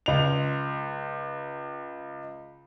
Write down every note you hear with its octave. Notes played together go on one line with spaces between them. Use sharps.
C#2 F7